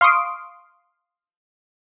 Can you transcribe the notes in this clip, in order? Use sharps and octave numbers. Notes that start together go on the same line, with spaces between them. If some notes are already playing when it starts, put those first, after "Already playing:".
F5 C6 C#6 D#6 D7